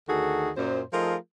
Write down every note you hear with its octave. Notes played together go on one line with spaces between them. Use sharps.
D2 D#3 F#4 G#4 A4
F#2 A#2 C5
F3 A3 D#4 F4 G#4 A#4